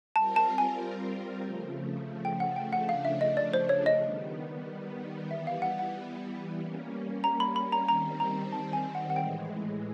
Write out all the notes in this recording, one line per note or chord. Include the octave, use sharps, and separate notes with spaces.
G3 C4 F4 A#4 A5
A5
G#5
C#3 F3 A3
G5
F#5
G5
C#3 F3 A3 D4 F#5
F5
E5
D#5
D5
C5
C#5
D#5
D#3 G3 B3
E3 G3 B3 E5
F5
F#5
F#5
G3 A#3 C#4
A#5
B5
B5
A#5
D#3 G3 C4 A#5
A#5
A5
G#5
F#5
F#5
A2 E3 G#3 G5